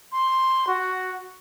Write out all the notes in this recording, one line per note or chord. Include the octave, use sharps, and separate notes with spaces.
C6
F#4